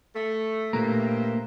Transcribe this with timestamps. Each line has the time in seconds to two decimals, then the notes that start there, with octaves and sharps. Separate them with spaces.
0.15 A3
0.73 G2 A#2 A3 A#3 C5 E5 A#5